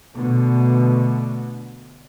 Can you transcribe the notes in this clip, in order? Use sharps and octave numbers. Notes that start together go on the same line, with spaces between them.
B2 D3 A3